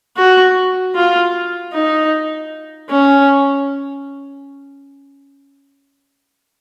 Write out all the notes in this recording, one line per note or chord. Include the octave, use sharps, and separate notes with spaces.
F#4
F4
D#4
C#4